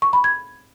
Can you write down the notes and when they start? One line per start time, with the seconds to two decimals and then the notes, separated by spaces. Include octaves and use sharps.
0.02 C#6
0.13 B5
0.24 G#6